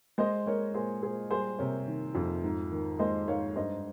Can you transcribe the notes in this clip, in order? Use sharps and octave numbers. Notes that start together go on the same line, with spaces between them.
G#3 C5 D#5
G#3 A#4 C#5
A#2 G#4 C5
A#2 G#4 C5
G3 G#4 C5
C3 A#4 C#5
D#3
F2
G#2
D#3
G#3 C5 D#5
G#2 C#5 F5
G2 C5 D#5